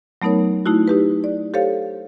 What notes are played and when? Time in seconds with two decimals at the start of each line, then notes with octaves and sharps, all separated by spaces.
0.22 F#3 A3 B3 D#4 A#4 C#5
0.66 A3 D#4 E4 F#4
0.88 D#4 G4 B4
1.24 D5
1.54 G4 A4 C5 C#5 F5